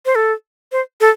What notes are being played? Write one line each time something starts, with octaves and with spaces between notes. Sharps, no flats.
C5
A4
C5
A4